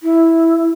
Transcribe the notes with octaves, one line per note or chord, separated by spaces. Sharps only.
E4